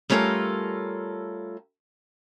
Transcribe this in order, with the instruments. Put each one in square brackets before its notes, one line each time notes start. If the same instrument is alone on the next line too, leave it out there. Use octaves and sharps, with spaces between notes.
[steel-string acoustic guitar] G3 A3 C#4 F4 A4 A#4